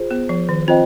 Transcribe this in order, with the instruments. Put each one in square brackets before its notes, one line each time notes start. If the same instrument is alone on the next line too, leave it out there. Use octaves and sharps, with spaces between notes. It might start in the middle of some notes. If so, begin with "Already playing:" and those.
Already playing: [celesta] F4 G#4 C5
[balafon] B3
F3
D#3
[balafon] C4 [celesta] F4 C5 D#5 G5